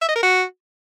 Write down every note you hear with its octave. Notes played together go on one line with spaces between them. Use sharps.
E5
D#5
A#4
F#4